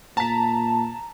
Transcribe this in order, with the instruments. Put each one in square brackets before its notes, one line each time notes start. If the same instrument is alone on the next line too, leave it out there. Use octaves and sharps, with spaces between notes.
[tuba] A#2 [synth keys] A5 [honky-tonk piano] A#5 B6